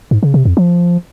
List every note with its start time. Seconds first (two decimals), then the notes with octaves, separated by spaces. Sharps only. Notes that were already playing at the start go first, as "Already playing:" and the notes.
0.11 G#2
0.23 C#3
0.34 C3
0.45 F2
0.57 F3